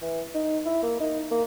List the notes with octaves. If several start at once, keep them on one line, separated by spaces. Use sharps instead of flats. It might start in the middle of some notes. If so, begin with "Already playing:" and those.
E3
D#4
E4
A#3
D#4
A#3